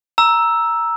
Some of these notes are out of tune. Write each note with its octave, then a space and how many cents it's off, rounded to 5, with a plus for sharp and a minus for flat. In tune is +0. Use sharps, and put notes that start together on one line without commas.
A#5 +5 E6 +0